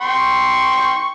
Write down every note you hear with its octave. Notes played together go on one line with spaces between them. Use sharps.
G5 C6 C#6